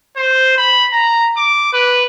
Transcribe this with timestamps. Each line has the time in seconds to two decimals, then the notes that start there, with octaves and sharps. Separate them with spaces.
0.17 C5
0.57 B5
0.93 A#5
1.37 D6
1.73 B4